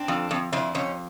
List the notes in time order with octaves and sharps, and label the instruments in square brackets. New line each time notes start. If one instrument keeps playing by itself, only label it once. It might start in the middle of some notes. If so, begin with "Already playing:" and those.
Already playing: [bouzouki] C4 D4
[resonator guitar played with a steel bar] F2
F2
[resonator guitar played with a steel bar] F2 [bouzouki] D4 E4
[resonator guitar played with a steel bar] F2 [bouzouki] C#4 D#4